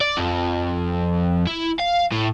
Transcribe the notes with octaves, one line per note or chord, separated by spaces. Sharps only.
D5
F2
E4
F5
A2